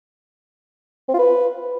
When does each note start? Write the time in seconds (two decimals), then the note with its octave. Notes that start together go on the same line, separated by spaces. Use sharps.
1.09 C4
1.14 F4
1.19 B4